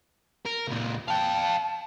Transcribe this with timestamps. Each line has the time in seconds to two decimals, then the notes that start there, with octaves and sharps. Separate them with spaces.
0.46 A#4
0.68 C#2 A#2
1.08 F5 G5 A5